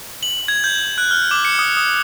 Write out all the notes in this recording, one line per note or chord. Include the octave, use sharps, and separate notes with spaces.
F#7
G#6
G6
F#6
F6
D6
C#7
D#6
D#6